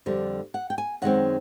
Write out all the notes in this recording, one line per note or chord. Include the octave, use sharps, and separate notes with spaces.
F2 D3 G3
F#5
G5
G#5
F#2 D#3 G#3 C4 F#5